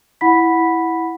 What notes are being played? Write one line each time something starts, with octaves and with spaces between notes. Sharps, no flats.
E4 F#5 B5 B6